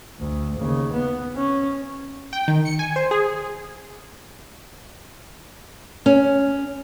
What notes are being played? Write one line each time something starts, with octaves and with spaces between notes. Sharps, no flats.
D2
D#2 C#3
B3
C#4
G5
D#3
C#7
G#5
C5
G#4
C#4